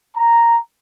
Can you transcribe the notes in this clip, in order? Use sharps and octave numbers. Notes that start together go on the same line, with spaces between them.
A#5